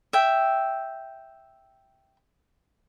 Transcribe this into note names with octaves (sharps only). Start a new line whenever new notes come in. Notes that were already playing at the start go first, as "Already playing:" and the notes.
E5 G5